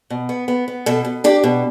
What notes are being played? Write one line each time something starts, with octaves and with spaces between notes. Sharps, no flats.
B2
B3
B3
B3
B2 A4
B2
D4 G4
B2